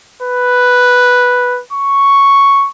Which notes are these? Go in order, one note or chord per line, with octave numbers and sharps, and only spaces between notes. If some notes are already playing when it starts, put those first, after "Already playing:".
B4
C#6